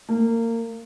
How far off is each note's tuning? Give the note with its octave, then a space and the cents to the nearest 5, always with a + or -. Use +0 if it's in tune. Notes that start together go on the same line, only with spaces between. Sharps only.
A#3 -25